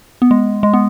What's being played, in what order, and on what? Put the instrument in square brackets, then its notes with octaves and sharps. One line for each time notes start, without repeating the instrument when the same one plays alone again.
[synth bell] B3
G#3
G#3
B3